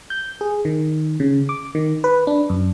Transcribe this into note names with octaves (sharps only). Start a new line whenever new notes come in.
G6
G#4
D#3
C#3
D6
D#3
B4
D4
F#2